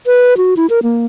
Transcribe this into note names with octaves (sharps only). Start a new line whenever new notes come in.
B4
F#4
E4
A#4
A#3